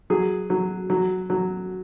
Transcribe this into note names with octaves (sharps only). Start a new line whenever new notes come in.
F#3 G#4
F#3
F#3
F#3